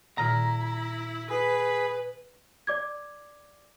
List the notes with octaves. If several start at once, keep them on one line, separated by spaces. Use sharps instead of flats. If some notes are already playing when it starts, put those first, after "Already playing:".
A#2 D#3 E4 A#5 F6
G#4 B4 B5
D5 D6 G#6